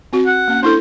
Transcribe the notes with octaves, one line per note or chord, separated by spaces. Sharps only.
C4 F#4
F#5
A#3 C#4
D4 E4 A4 C5